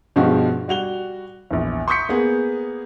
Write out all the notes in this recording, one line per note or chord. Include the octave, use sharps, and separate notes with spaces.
G2 B2 F3 G#3 F#4 G4
G3 F#4 F7 G7
A#1 E2
C6 C#6 D#6 G6 B6 C#7
A#3 B3 G#4